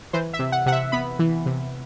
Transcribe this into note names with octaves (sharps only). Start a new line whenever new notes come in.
E3 C5
E5
C3
F#5
C3 F#5
E5
B3 B5
E3
C3